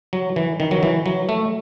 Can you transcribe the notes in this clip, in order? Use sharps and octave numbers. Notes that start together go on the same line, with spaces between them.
F#3
E3
D#3
F#3
E3
F#3
A3